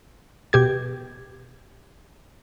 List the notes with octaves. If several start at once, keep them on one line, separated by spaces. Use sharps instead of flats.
B2 G4 G#6